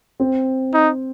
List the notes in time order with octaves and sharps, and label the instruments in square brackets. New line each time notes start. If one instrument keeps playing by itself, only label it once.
[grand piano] C4
[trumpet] D#4